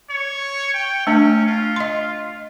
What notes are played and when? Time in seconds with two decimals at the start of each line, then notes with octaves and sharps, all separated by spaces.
0.10 C#5
0.74 G5
1.07 A3 C#4 D4
1.46 F4
1.76 D#5 C6